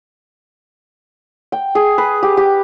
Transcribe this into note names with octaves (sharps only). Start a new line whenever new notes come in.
G5
G#4
B4
G4
G4